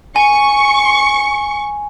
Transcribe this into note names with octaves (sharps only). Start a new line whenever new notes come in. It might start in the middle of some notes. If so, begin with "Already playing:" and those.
G#5 C#6